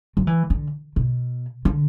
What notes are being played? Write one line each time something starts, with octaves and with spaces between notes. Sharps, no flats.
F#3
E3
D3
B2
D3